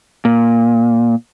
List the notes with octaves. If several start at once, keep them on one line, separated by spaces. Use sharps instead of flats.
A#2